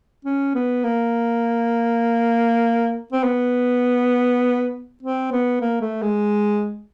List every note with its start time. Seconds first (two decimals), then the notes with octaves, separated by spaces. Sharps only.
0.25 C#4
0.55 B3
0.84 A#3
3.12 C4
3.24 B3
5.03 C4
5.32 B3
5.61 A#3
5.81 A3
6.02 G#3